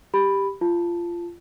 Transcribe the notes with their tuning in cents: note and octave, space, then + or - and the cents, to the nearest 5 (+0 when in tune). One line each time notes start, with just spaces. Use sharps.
G4 +0 B5 +0
F4 -20 A5 +0